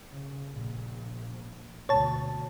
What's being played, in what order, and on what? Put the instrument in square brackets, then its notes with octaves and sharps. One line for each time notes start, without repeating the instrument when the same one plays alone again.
[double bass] C#3
A#1
[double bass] D2 B2 [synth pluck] C#5 A5